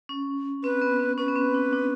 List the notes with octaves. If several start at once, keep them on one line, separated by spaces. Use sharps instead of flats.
C#4
C4 B4
B3
C4
C#4 B4
B3
C4
D4
D4